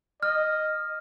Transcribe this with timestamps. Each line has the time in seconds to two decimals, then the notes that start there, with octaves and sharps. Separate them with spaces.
0.23 D#5 F6